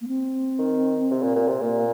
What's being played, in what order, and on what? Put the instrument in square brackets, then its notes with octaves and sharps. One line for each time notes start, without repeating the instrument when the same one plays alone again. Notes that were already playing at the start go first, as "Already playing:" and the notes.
[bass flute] A#3
C4
[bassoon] D#3
C3
A#2
A#2
C3
[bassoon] A#2 [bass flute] A#3